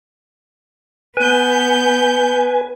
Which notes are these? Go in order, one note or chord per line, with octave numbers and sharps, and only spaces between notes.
B3 B4 G#5 G6